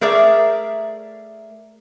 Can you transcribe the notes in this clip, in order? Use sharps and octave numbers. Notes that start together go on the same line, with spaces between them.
A3 G#4 A#4 D5 E5